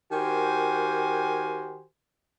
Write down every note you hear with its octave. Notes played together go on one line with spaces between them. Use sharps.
D#3 F#4 G4 A#4 C5 G#5